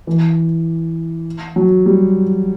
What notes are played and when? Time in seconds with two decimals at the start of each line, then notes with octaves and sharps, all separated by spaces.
0.07 E3
1.56 F#3
1.86 G3